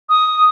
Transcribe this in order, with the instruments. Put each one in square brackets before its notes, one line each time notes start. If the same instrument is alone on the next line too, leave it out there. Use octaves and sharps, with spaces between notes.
[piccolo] D#6